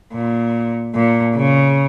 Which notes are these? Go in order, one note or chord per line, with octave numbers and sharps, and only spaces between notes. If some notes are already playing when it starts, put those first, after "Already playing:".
A#2
A#2
C#3